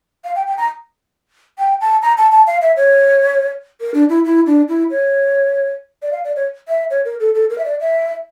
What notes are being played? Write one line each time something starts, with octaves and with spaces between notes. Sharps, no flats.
F5
G5
G5
A#5
G5
A5
A#5
A5
A5
F5
E5
C#5
A#4
D4
E4
E4
D4
E4
C#5
D5
F5
D5
C#5
E5
C#5
A#4
A4
A4
A#4
E5
D5
E5